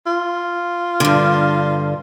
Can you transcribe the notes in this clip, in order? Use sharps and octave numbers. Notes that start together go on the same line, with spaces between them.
F4
G2 D3